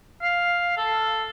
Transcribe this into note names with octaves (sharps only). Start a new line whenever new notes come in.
F5
A4